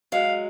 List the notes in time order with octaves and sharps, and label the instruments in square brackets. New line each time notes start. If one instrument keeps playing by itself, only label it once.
[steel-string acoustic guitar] F#3 G#3 [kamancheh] F5